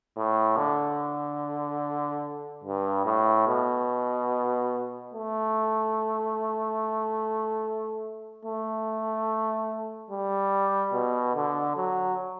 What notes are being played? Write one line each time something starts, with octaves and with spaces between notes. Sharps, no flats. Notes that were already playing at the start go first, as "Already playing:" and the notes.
A2
D3
G2
A2
B2
A3
A3
G3
B2
D3
F#3